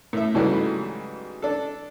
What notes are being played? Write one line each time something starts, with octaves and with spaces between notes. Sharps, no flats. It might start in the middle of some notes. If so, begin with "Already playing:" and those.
A2 E5
G#2 C#3 E3 F#3 G3 A3
D4 A4